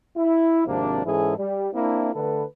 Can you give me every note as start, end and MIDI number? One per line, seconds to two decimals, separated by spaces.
0.17 0.63 64
0.67 1.02 32
0.67 1.02 48
0.67 1.02 53
0.67 1.02 58
0.67 1.02 62
1.05 1.35 44
1.05 1.35 52
1.05 1.35 61
1.05 1.35 64
1.05 1.35 68
1.05 1.35 69
1.38 1.68 55
1.73 2.11 58
1.73 2.11 60
1.73 2.11 62
1.73 2.11 64
2.15 2.44 50
2.15 2.44 57
2.15 2.44 69
2.15 2.44 71